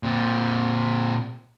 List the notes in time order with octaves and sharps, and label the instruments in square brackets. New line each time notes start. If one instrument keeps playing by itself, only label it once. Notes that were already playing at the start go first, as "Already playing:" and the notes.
[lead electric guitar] A#2 C4